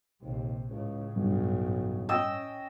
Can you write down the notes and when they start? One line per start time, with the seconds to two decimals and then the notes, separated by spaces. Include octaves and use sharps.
0.22 A#1 D#2 C3
0.70 C#2 A2 C#3
1.16 B1 G2
2.09 C#4 D#5 G5 E6